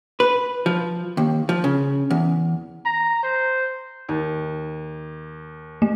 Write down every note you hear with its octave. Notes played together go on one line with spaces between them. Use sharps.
B4
F3
D#2
F3
C#3
E2
A#5
C5
D#2
A3